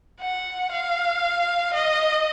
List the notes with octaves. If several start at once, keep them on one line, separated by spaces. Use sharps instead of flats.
F#5
F5
D#5